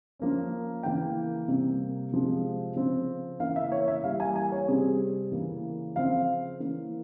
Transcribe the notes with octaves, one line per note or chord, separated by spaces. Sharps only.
F3 A#3 C#4
C#3 E3 A#3 G5
C3 G3 A#3
C3 F3 G#3 C4
C#3 F3 C4
C#3 E3 A#3 F5
E5
C#5
E5
E3 G3 A#3 F5
G#5
G#5
C#5
C3 G3 C4 G#4
C#3 E3 A#3 C#4
C#3 F3 C4 F5
E3 A#3 C#4